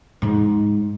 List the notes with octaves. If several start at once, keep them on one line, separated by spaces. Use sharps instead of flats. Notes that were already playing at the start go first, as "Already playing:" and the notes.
G#2 G#3